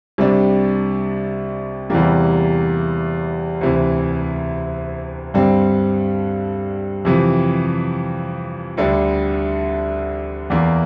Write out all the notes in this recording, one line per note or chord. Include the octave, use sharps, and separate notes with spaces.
C2 C3 G3 D4
E2 C3 E3 G3 A#3
D2 C3 E3
G2 D3 G3 C4
F2 C3 E3
D2 D3 G3 D4
E2 E3 A#3